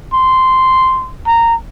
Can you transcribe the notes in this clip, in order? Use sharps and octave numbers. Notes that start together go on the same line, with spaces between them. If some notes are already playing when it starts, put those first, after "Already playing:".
C6
A#5